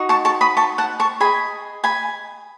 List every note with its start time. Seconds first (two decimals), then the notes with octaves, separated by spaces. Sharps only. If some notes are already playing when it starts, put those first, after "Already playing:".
Already playing: D#4 F#4
0.09 A5 C#6
0.25 A5 C#6
0.41 B5 D#6
0.57 A5 C#6
0.78 F#5 A5
1.00 A5 C#6
1.20 G#4 D#5 G#5 B5
1.84 G#5 B5